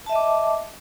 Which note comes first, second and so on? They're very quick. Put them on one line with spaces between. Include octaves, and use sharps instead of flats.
A5 E5 D#5 D6